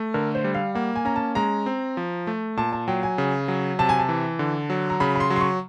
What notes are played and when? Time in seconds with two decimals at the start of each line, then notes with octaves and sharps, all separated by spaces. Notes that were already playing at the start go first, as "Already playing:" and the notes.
Already playing: A3
0.14 D3 A#4
0.35 C5
0.44 G3
0.54 F5
0.75 A#3 F#5
0.96 G#5
1.05 C#4 A#5
1.16 A5
1.35 G#3 A#5
1.66 C4
1.97 F3
2.27 A3
2.57 A#2 A5
2.73 A5
2.88 F#3 G5
3.03 G#5
3.18 C#3
3.48 F#3
3.79 C3 A5
3.89 G#5
3.99 A5
4.09 E3
4.39 D3
4.70 F#3
4.90 A#5
5.00 C#3 B5
5.16 B5
5.20 C6
5.30 F#3
5.36 C6
5.41 C#6